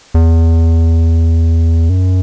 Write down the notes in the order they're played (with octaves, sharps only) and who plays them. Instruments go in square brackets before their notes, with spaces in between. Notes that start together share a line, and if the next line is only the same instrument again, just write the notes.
[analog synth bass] E2
F#2